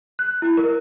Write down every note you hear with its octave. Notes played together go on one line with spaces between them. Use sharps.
F#6
E4
A#4